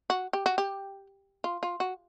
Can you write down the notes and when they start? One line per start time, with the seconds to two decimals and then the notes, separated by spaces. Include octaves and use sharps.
0.10 F#4
0.33 G4
0.46 F#4
0.58 G4
1.44 F4
1.63 F4
1.80 F#4